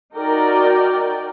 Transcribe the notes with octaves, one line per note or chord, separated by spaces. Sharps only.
D#4 F#4 A#4 D5 G5